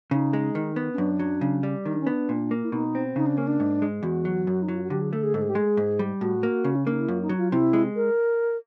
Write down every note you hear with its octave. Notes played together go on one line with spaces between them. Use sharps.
C#3 D#4
G#3
D#3
B3
C#4
F#2 D4
F#3
C#3
G3
D#3 D#4
D4
C#4
B3 D4
A#2
A#3
E4
B2 D#4
C4
C#3 D#4
D4
A#3 C#4
D4
G#2
G#3
E2 F#4
F#3
F#2
D#4
F#3 E4
F4
F#4
D3 G4
G#4
A3 A4
G#4
G#2 A4
G#4
G4
G#3 G#4
G#2
G3
A2 F#4
A#3
C#3
C#4
A#3 D4
D#4
E4
F#2 F4
D#4
F#3
F4
C3 E4
G#3
A#4